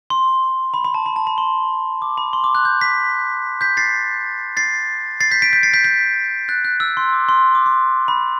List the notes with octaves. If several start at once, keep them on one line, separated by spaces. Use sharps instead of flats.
C6
B5
B5
A5
B5
A5
B5
C6
D6
B5
C6
D6
F#6
G6
G6 B6
G6 B6
A6 C7
A6 C7
A6 C7
G6 B6
B6 D7
G6 B6
A6 C7
G6 B6
G6 B6
F#6 A6
F#6
E6
C6
D6
C6
D6
C6
B5